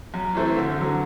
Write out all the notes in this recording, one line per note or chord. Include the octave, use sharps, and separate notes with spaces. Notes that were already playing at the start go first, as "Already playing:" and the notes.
F#2
E3 A3 C4
D2
D3 F#3